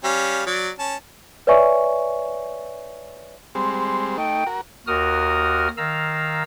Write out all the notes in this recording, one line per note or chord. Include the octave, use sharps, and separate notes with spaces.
G3 C#4 F5
F#3 D5
C#4 A5
B4 C#5 D5 E5 G#5 C#6
G3 G#3 C4 C6
A3 D#4 G5
F#4 A#4
D#2 F#4 A#4 D#6 F6
D#3 F5 A#5 E6